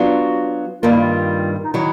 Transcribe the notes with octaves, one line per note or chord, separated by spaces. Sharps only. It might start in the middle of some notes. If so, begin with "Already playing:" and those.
Already playing: F#3 B3 D4 F4 F#4
G2 D#3 G3 A#3 F4
E4
F4
D#4
D#3 F#3 E4